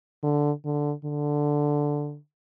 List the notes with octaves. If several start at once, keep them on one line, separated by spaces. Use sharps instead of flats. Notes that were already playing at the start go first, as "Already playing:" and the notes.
D3
D3
D3